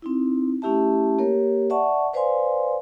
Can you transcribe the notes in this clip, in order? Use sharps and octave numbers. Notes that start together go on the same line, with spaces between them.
C4 D#4 E4
A3 C#4 E4 G4 E5 A5
A#3 G4 A#4 C#5
D5 E5 F#5 A5 C#6
B4 C5 D5 F5 G#5 C6